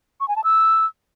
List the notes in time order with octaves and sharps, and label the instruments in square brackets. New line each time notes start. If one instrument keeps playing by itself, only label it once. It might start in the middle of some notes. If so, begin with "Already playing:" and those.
[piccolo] C#6
G#5
A5
E6